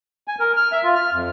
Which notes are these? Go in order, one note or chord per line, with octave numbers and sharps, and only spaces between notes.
G#5
A#4
F6
E5
F4
F6
F2